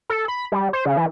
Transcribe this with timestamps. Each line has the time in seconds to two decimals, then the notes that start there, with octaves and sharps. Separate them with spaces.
0.10 A4
0.28 B5
0.52 G3
0.73 C5
0.86 C#3
0.97 E3